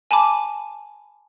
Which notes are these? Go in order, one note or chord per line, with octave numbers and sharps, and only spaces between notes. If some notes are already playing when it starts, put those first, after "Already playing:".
G#5 A5 B5 D6